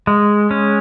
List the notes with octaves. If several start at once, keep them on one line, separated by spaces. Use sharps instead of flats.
G#3
C#4